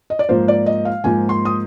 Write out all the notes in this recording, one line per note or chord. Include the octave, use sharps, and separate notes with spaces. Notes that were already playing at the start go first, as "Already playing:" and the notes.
D#5
D5
G#2 F3 A#3 C5
D5
D#5
F5
G#2 F3 A#3 G#5
C6
D#6